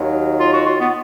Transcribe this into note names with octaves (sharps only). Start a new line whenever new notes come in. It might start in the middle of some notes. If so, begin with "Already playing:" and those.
Already playing: D#2 D#3 F#3
F4
F#4
F4
B3